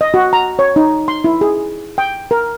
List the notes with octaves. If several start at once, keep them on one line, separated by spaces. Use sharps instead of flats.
D#5
F#4
A#5
C#5
D#4
C6
E4
G#4
G5
A#4